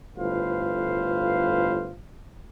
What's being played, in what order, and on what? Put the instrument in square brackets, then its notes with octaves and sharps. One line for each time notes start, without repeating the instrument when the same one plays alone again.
[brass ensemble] G1 A2 F4 B4 C5 F5